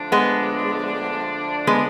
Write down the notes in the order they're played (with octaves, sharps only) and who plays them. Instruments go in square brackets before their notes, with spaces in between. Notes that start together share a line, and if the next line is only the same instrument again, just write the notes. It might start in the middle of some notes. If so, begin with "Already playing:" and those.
Already playing: [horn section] D3 F3 A3 D4
[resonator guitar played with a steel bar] G#3 B3
G#3 B3